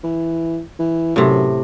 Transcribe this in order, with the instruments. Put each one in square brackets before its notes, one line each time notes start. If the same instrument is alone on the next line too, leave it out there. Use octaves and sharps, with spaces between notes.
[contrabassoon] E3
E3
[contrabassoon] F#2 [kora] A2 C3